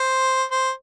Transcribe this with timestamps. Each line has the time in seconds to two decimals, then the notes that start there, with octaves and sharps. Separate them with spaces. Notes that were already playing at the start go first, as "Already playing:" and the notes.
Already playing: C5
0.51 C5